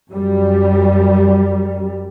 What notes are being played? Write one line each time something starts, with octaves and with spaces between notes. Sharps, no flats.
F#2 G3